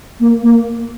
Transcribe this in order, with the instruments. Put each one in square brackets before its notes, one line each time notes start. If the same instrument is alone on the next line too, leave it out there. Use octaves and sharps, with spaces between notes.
[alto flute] A#3
A#3